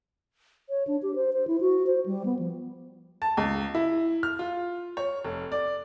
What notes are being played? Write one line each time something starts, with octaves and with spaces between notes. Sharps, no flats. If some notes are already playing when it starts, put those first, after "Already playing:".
C#5
D4
G4
C5
C5
E4
F#4
C5
G3
B3
F3
A5
C#2
E4
F6
F4
C#5
F1
D5